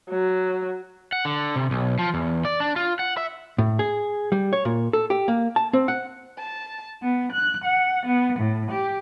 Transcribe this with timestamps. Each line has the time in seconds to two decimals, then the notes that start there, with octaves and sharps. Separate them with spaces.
0.11 F#3
1.13 F#5
1.25 D3
1.56 C3
1.71 B1
1.99 F3
2.14 E2
2.45 D5
2.60 D4
2.76 F4
2.99 F#5
3.17 E5
3.58 A2
3.79 G#4
4.32 G3
4.53 C#5
4.65 A#2
4.93 A4
5.10 G4
5.28 A#3
5.56 A5
5.73 C4
5.88 F#5
6.38 A5
7.02 B3
7.33 F#6
7.65 F#5
8.07 B3
8.39 A2
8.71 G4